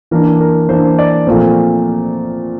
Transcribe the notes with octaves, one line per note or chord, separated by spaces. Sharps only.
E3 A#3 D4 A#4
A#4
E3 A#3 D4 C5
D5
A#2 F3 A3 C4 C5